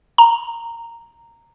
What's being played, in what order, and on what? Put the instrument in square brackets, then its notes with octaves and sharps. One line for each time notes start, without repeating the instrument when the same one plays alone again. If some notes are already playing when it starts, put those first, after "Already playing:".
[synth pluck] A#5